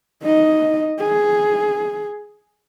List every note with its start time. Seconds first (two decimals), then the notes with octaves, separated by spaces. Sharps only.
0.23 D#4 D#5
0.99 G#4